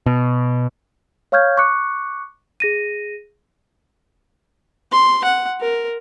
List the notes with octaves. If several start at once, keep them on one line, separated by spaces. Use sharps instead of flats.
B2
C#5 F5 C#6 F6 G6 G#6
C#6 D6 F#6 C#7
G#4 A#6 D#7
C6
F#5
A#4